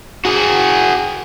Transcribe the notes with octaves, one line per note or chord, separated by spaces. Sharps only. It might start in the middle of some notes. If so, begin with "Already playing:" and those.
F#4 G#4